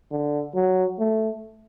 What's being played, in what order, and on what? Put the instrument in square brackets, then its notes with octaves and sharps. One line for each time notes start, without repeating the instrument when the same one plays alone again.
[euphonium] D3
F#3
A3